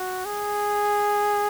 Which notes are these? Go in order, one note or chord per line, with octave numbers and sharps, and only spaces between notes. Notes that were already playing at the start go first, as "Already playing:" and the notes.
Already playing: F#4
G#4